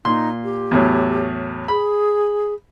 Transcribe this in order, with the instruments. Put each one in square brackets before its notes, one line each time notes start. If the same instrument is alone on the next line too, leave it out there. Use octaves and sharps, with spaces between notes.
[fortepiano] A#2 C6 [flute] D#4
[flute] G4
[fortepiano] E2 A2 F#3
[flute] G#4 [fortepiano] B5